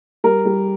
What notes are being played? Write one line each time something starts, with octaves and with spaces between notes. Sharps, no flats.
G3 A#4
G3